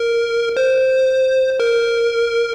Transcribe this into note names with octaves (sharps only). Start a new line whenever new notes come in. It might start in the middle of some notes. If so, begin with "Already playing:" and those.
Already playing: A#4
C5
A#4